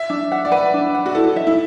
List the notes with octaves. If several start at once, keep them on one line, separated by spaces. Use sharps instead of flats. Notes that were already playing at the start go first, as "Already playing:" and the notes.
Already playing: E5
D4
F#5
D5
B4 F#5
D4
F#5
F#4
E4 A4
E5
E4